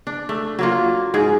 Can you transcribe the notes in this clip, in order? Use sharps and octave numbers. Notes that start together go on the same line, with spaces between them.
D4
A3
F#3 A#3 F4
G#2 G#4